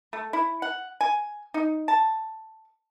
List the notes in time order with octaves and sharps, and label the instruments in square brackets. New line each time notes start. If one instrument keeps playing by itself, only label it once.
[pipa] A3
E4
F#5
G#5
D#4
A5